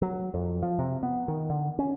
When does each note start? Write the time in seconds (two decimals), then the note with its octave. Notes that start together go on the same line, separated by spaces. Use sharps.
0.02 F#3
0.34 F2
0.63 F3
0.79 C3
1.03 B3
1.28 D#3
1.50 D3
1.79 C#4